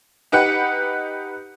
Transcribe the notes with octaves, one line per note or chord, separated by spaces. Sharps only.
D#4 G4 B4 F#5